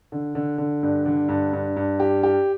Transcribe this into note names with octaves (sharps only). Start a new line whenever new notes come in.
D3
D3
D3
G2
D3
G2
G2
G2
G4
G4